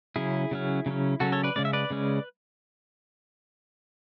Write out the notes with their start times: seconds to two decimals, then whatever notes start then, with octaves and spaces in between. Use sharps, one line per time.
0.16 C#3 F#3 C#4 E4 G#4
0.51 C#3 F#3 C#4
0.86 C#3 F#3 C#4
1.20 C#3 F#3 C#4 F#4 A4
1.32 A4 C#5
1.44 B4 D5
1.56 C#3 G#3 C#4 D5
1.65 E5
1.73 B4 D5
1.90 C#3 G#3 C#4